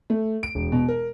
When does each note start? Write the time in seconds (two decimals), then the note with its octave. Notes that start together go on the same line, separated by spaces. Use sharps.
0.10 A3
0.43 D7
0.55 E1
0.72 B2
0.88 A#4